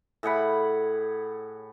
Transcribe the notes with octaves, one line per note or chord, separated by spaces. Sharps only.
A2 G#4 F#5 B5